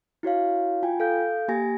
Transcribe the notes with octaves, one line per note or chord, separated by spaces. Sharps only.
E4 F#4 C#5 F5
F4 G5 G#5
A4 F5 G6
A#3 G4 G#5 A#6